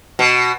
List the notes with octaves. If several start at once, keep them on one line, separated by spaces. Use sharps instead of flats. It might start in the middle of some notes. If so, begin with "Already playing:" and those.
B2